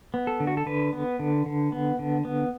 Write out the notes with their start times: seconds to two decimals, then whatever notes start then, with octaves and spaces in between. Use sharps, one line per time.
0.14 B3
0.27 A4
0.40 D3
0.47 F#4
0.57 A4
0.66 D3 B4
0.93 B3
1.19 D3
1.46 D3
1.72 B3
1.99 D3
2.25 B3